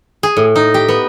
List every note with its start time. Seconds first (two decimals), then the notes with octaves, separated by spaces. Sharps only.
0.23 G#4
0.37 A2
0.56 D#4
0.74 G4
0.88 B3